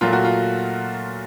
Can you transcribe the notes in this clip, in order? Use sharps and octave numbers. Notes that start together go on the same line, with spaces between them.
A#2 F#3 A3 F4
F#4
F4